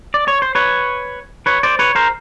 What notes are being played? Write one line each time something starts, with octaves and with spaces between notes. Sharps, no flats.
D5
C#5
C5
B4 C#5
B4 C#5
C5 D5
B4 C#5
A#4 C5